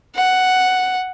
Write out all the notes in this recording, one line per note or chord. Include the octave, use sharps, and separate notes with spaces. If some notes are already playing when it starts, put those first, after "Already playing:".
F#5